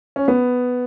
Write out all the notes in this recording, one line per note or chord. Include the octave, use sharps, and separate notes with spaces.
C#4
B3